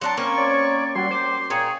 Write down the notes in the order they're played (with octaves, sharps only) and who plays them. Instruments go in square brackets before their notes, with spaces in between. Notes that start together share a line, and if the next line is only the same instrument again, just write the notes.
[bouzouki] F#3 D4 A5 [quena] C6 [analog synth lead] C#7
[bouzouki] A#3 C4 C#4 [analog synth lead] C#6
[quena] C#5 [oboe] D5
[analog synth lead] G3 [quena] F#4 [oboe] C6
[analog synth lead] C5 [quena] D6
[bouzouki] A#2 [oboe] G#4 [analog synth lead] C#5 [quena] G5